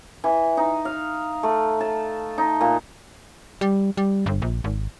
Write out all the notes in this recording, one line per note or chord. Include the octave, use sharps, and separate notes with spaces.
E3
D#4
F5
A3
A5
D#4
A#2
G3
G3
G1
A#1
G#1